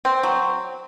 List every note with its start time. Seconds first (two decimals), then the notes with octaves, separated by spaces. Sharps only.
0.05 C4
0.23 F#3